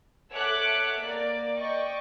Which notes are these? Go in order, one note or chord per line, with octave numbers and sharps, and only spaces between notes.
A4 C#5 E5 F#5 D6 F#6
A#3 D5
D5 D#5 G5 C#6